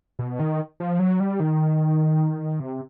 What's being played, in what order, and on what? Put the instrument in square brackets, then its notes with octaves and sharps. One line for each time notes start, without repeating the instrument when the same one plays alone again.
[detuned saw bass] B2
D#3
F3
F#3
G3
D#3
C3